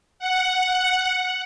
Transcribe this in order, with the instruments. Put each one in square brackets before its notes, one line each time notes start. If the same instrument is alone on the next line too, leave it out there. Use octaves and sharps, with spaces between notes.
[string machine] F#5